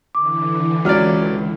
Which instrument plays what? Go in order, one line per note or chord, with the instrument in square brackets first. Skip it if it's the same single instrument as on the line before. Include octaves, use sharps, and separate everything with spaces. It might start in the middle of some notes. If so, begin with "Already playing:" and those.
[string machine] D3 E3 [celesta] D6
[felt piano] C#2 F6 [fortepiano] F#3 C#4 D5